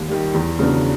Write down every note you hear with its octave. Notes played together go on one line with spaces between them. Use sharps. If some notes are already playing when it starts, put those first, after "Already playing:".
Already playing: D#2
D#3 G3
E2
C#3 F#3 B3 D4